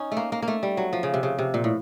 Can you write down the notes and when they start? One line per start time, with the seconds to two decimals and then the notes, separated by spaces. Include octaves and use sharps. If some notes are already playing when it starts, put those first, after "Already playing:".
Already playing: C#4 D#4
0.12 A3
0.17 A#3
0.32 A#3
0.42 A#3
0.48 A3
0.63 G3
0.77 F#3
0.93 F3
1.03 C#3
1.14 C3
1.23 C#3
1.39 C3
1.54 A#2
1.64 A2